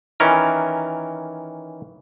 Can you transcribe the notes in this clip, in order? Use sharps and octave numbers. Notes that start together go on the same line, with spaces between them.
D#3 E3 C#4 A#4